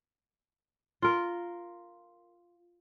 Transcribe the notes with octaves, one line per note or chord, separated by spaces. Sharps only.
F4 A#4